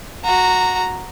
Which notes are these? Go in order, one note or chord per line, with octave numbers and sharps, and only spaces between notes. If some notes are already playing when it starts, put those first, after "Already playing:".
F#4 A#5